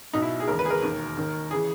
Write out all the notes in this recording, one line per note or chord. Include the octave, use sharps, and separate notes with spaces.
B1 B2 D#4
E4
G#4
E1 D#2 C#3 E3 A#4
B4
G#4
A#4
E1 D#2 D#3
D#2 D#3
C#3 E3 G#4